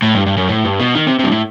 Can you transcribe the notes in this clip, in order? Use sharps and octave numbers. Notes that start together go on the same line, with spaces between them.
A2
G2
G2
F#2
A2
G2
B2
D#3
C3
G2 C3
A2